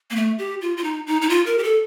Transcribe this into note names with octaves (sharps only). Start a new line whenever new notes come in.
A#3
A3
G4
F4
F4
D#4
D#4
D#4
F4
A#4
G4
A4